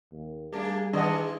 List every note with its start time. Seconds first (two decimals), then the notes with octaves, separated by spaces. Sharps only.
0.12 D#2
0.53 G3 A3 A#3 D4 G#4
0.93 D#3 E3 G#3 D4 D#5 F#5